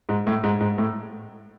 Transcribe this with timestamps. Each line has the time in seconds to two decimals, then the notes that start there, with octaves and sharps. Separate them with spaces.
0.09 G#2
0.27 A2
0.43 G#2
0.60 G#2
0.78 A2